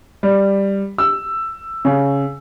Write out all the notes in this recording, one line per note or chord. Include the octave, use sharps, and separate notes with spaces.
G3
E6
C#3